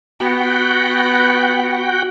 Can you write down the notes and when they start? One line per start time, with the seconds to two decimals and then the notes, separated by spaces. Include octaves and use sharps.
0.20 B3 F#4 F#5 G5